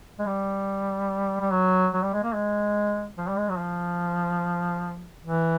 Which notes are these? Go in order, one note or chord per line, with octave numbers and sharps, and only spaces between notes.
G#3
G3
G3
F#3
F#3
G3
G#3
A#3
G#3
F3
G3
G#3
F#3
F3
E3